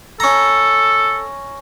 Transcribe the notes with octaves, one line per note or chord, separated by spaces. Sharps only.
C#4 A4 A#5